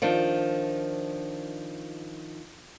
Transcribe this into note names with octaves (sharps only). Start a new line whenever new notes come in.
D#3 F3 D4